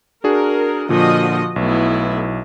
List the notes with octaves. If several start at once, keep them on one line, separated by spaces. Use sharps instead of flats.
D4 F#4 G#4 A#4
A#2 D3 F3 F#4 D#5
B1 A3 B3 E4